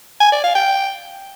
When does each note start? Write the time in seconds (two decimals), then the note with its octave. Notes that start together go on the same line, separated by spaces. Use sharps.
0.20 G#5
0.32 D5
0.44 F5
0.55 G5